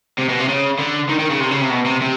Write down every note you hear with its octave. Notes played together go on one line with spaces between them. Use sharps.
C3
B2
C3
C#3
D3
D#3
D#3
C#3
C3
C#3
C3
B2
C3
C3